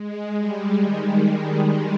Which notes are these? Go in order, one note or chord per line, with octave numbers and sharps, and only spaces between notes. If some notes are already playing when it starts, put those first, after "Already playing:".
Already playing: G#3
G3
D#3